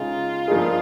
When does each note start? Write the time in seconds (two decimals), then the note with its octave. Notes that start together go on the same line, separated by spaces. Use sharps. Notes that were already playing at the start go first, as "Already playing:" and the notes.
Already playing: C#3 G#3 D#4 F4
0.48 G2 F3 A#3 D#4 G#4